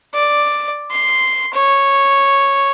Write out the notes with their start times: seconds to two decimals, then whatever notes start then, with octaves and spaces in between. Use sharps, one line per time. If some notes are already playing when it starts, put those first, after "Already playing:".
0.14 D5
0.91 C6
1.54 C#5